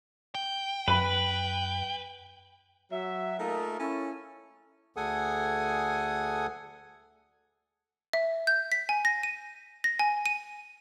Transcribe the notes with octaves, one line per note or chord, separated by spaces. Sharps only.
G5
F#2 B4 B5
F#3 E5
A3 A#3 D#4 F4 G#4 A#4
C#4 E4 A4
D2 G#4 A4 F#5 G#5 D#6
E5
G6
B6
G#5
A#6
D#7
A#6
G#5
D#7